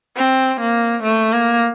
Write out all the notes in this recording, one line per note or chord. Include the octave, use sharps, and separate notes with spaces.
C4
A#3
A3
A#3